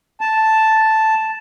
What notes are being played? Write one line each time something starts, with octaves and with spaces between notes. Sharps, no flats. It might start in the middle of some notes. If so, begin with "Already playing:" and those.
A5